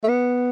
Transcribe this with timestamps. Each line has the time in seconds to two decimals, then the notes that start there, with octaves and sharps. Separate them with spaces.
0.03 A3
0.08 B3